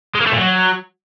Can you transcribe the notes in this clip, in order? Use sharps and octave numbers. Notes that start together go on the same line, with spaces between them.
G#3
A#3
A3
A#2
F#3